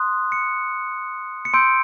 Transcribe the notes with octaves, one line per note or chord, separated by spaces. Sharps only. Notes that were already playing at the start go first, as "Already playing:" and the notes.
Already playing: C6 D#6 F#6
C#7
C#7
C6 E6 G6 D7